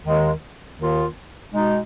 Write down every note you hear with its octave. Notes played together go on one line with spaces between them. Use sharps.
D#2 D#3 G#3
D#2 D#3 A#3 F4
B2 G#3 D#4